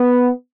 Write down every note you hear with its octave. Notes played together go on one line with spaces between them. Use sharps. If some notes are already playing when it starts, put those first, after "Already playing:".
Already playing: B3